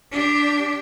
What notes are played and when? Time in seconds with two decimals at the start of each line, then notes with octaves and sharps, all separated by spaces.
0.12 D4 G4